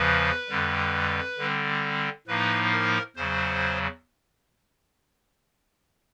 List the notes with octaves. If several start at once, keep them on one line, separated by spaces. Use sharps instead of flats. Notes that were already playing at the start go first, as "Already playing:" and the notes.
Already playing: E2 C#3 F3 B4
F2 D3 G3
D3 G3 C4
A2 F3 A#3 D#4 B4
A#4
E2 C#3 F#3 C5